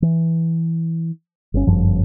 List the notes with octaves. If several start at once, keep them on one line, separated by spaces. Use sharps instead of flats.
E3
G1 C#4
G1 F#2 F3